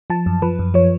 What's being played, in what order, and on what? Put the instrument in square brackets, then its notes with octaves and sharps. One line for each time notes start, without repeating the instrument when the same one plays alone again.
[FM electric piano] F3 A5
F#2
F3 B4
F#2
F3 C#5